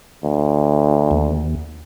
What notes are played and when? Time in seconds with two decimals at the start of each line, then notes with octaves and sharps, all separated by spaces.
0.24 D2
1.11 D#2